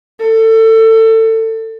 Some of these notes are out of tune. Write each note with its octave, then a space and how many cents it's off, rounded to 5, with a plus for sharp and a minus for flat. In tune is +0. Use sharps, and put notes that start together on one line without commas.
A4 +25